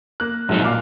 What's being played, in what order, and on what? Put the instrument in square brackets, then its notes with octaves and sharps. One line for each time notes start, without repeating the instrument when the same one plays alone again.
[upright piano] A#3 F#6
[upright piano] A#1 [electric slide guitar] G#2 F#3 D#4
[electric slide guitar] A#2 [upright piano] F5 D6 F6